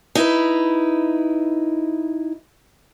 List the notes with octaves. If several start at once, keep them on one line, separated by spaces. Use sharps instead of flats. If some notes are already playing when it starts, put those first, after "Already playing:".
D#4 E4 B4